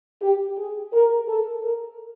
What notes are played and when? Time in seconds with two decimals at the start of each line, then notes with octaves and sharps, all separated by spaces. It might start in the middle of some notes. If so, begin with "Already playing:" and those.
0.21 G4
0.57 G#4
0.93 A#4
1.28 A4
1.63 A#4